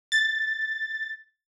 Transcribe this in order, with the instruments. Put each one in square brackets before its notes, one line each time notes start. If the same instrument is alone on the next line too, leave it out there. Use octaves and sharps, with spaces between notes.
[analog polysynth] A6